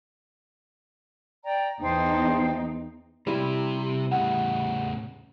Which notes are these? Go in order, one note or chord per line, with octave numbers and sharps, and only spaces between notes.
D5 G5 A#5
E2 D#4 C5 G5 A5
C3 G3 E4
A2 C#3 F#5